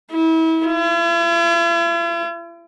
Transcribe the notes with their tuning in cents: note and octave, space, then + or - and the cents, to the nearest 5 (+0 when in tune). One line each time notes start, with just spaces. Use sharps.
E4 -30
E4 +45